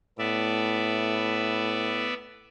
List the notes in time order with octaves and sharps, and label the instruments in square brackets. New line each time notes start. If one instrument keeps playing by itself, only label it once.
[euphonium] A2 [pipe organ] B3 D5 E5